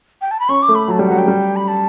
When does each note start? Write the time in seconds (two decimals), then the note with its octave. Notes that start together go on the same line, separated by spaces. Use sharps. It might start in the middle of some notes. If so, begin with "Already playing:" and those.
0.22 G5
0.31 A5
0.40 B5
0.49 C#4 C#6
0.62 D6
0.69 A3
0.75 B5
0.88 F#3 A5
0.99 G3 G5
1.08 F#3 F#5
1.19 G5
1.28 G3
1.56 B5
1.68 A5